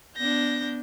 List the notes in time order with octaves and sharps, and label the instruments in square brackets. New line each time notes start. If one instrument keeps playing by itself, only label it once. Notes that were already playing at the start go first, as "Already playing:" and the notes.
[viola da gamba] B3 D4 [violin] G6 A#6